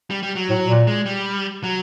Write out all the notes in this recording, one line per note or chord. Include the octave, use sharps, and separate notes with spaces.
G3
G3
F#3
A2
A#2
G#3
G3
F#3